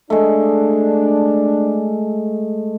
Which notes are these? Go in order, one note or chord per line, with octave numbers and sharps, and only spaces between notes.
G#3 A3 D4